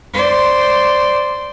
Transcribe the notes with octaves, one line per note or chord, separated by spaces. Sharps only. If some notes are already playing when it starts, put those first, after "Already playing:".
C5 D5